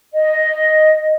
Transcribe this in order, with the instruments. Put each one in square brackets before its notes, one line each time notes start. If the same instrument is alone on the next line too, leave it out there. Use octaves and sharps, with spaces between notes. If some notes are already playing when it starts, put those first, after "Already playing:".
[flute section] D#5